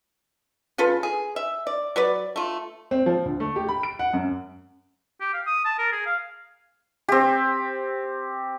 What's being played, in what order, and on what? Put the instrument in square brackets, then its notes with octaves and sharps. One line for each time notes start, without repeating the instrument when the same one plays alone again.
[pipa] C#3 F4 A4 B4
G#4
E5
D5
F#3 B4 D5
A3 F4
[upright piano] C4
F3
D2
A3
G4
B5
D7
F#5
F#2
[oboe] G4
F5
D#6
A5
A#4
G#4
F5
[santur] C4 G4